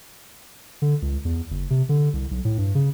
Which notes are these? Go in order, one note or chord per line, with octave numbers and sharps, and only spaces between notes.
D3
C#2
E2
F#1
C3
D3
C2
B1
A2
G2
C#3